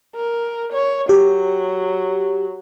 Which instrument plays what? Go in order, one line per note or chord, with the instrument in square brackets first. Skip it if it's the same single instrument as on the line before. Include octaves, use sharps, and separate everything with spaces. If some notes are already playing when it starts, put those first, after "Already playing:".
[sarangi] A#4
C#5
[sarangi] F#3 [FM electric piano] G4